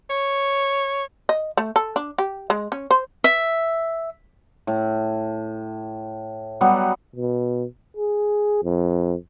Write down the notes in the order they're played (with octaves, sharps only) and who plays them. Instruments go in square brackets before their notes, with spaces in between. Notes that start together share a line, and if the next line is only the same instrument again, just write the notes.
[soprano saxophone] C#5
[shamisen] D#5
A3
A4
D4
G4
G#3
C#4
C5
[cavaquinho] E5
[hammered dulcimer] A2
F#3 G3 B3 F#5
[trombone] B2
G#4
F2